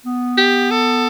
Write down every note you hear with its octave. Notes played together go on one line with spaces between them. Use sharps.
B3
G4
A4